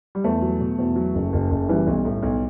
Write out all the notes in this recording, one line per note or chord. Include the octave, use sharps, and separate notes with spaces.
G3
E2 A3
F#3
B2
E2
F#3
F#1
F#1
F#1
E3 G3
B1
A2
B1